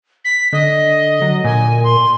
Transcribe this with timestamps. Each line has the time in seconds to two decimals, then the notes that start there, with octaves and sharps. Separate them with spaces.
0.25 B6
0.53 D3 D#5
1.22 F#3
1.44 A#2 G#5
1.84 C6